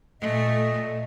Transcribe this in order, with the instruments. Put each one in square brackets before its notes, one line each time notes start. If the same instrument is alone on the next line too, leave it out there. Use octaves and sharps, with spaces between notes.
[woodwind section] A#2 D#5 [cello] A3